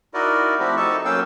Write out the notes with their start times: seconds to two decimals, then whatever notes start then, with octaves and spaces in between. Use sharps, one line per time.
0.14 D#4 E4 F#4 A#4 D5 D#5
0.60 F3 A3 C4 E4 F#4 G4
0.77 D#4 A4 A5 C#6
1.05 F#3 A#3 C#4 F5 G5 E6